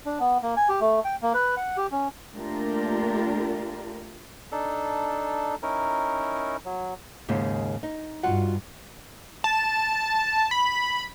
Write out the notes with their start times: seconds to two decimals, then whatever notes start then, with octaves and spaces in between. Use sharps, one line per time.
0.06 D4
0.20 B3
0.42 A#3
0.57 G#5
0.69 G4
0.81 A3
1.05 G5
1.22 A#3
1.34 B4
1.57 F#5
1.77 G4
1.92 C#4
2.34 A3 A#3 D4 F4 G4 A#4
4.52 D4 D#4 A4
5.62 C#4 D#4 E4 A#4
6.65 F#3
7.29 D#2 G#2 C#3
7.83 D#4
8.23 G2 F4 F#4 F#5
9.44 A5
10.51 B5